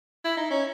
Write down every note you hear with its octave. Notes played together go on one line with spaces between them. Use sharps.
E4
D#4
C#4